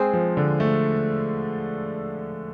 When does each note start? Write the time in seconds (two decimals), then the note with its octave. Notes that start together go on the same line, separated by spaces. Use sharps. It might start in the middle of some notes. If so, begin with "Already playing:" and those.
Already playing: G#3 C4 G#4 C5
0.13 F3
0.37 D3
0.60 A3